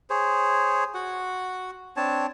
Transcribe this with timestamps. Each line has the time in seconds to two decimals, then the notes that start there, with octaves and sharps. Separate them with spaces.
0.10 G#4 C5 C#5
0.94 F#4 F#5
1.96 C4 D4 C#5 A5